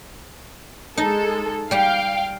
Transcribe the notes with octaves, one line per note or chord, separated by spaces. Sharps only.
G#3 D#4 A4
G3 G4 F5 G5